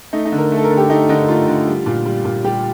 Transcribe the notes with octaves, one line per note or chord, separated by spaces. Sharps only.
A3 D#4
D#4
D3
A#4
A3
A4
A#4
D3
G4
A3 D#4
D3 D#4
A3 F4
D3
G3
A#2
G3
A#2
G3 G4